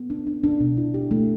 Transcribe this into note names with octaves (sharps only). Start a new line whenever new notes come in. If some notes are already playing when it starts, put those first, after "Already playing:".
Already playing: B3
D4
D4
D4
B2
E4
G4
A3